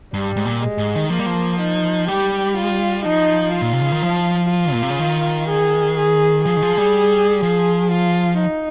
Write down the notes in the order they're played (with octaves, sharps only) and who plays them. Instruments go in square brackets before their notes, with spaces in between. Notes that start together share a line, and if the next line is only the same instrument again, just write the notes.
[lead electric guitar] G2 [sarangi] G3
[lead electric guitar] G#2
A#2
[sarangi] G#3
[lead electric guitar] G#2
D#3
[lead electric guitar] F3 [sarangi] A#3
[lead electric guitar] G3
F3
[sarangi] D#4
[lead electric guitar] G3 [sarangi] G4
[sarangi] F4
[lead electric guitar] F3 [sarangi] D#4
[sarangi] F4
[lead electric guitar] A#2
C3
C#3
D#3
F3
[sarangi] F4
[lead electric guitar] A#2
C3
C#3
D#3
[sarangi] G#4
G#4
[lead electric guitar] F3 [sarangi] G#4
[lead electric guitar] D#3
F3
G3
[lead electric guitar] F3 [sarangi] G#4
[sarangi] F4
D#4